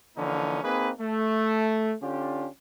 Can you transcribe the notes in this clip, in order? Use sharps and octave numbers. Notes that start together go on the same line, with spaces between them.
D3 E3 F3 A#3 C#4 D#4
A#3 C4 D#4 G#4 B4
A3
D3 C#4 D4 F4 G4